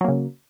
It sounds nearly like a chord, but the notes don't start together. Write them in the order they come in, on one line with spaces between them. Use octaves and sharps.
F#3 A#3 C#3